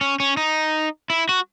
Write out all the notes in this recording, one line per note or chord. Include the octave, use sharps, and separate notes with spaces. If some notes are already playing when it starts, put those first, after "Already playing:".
C#4
C#4
D#4
E4
F#4